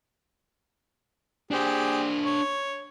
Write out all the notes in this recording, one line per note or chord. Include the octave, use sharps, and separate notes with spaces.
D4 G4 G#4 C5
C#5